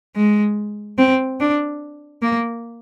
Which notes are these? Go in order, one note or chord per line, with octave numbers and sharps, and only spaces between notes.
G#3
C4
D4
A#3